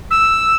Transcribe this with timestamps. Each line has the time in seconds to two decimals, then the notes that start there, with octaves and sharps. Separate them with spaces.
0.11 E6